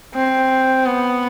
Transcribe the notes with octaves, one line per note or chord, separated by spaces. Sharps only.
C4
B3